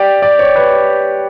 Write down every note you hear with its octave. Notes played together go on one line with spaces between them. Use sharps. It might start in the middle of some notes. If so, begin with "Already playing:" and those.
Already playing: G4 D5
D5
C#5
B4